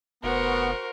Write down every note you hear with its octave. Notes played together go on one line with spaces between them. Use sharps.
F1 B3 F#4 A#4 C5 C#6